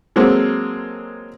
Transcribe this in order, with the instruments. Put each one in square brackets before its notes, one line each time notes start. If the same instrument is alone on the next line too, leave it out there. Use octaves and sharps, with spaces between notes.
[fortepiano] F#3 G#3 A#3 C4 A4